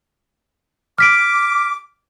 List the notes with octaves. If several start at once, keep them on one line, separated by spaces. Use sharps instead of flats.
D6 F6 B6 D7